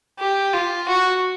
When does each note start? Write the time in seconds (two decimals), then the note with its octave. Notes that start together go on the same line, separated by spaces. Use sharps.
0.19 G4
0.54 F4
0.88 F#4